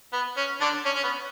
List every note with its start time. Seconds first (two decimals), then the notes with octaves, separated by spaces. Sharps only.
0.13 B3
0.37 C#4
0.61 D3 D4
0.85 C#4
0.96 C#4
1.04 B3